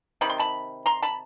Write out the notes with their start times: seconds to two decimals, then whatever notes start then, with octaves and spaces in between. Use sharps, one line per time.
0.21 C3 D#3 G3 B5
0.29 C6
0.39 A5 B5
0.86 A#5 C6
1.02 A5 B5